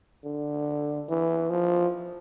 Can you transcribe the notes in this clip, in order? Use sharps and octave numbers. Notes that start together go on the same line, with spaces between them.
D3
E3
F3